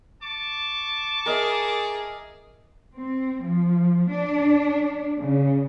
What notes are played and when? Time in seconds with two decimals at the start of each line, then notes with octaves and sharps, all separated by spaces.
0.23 A5 C#6 D6
1.26 G#4 A#4 D#5 E5
2.95 C4
3.43 F3
4.09 D4
5.19 C#3